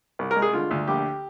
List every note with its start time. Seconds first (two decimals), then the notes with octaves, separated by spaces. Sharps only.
0.19 C2
0.31 A#4
0.36 G#3
0.42 G#4
0.53 D3 F4
0.71 D2
0.87 A#1 G4